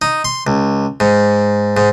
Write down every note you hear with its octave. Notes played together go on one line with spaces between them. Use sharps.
D#4
C6
C#2
G#2
G#2